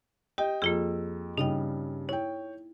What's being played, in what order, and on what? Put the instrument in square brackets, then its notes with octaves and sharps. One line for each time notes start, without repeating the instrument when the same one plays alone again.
[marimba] G4 [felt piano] D#5 G5
[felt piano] F2 E6 [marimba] A#3 F4 G#4
[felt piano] G2 C#3 [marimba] D#4 D#5 G5
[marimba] E4 [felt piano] C#5 G5